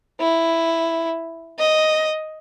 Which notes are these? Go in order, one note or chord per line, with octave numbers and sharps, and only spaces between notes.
E4
D#5